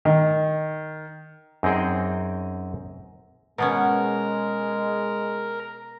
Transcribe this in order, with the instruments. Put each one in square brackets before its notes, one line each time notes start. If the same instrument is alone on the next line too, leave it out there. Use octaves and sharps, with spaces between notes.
[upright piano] D#3
[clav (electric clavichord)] F#2 C4 D#4 G#4 G5
[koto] B2 B3 C#4 [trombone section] G#3 [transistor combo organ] A#4